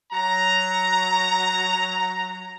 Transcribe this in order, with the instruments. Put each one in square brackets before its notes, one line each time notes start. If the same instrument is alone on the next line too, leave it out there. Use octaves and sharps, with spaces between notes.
[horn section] F#3 A#5